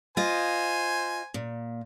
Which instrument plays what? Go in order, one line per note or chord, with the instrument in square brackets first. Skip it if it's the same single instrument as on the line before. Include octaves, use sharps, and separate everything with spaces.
[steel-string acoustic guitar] F4 D#5 [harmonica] C5 G#5
[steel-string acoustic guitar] A#2